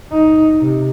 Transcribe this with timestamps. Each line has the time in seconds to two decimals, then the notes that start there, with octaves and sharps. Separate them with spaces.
0.11 D#4
0.61 C3